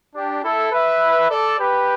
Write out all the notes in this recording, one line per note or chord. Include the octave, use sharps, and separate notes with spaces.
D4 G4
E4 A4
B4 E5
A4 D5
G4 B4